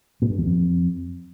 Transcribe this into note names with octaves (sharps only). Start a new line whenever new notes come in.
A#2
G2
E2
F2